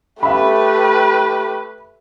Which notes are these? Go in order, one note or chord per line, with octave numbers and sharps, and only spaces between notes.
A3 G4 B4 E5 B5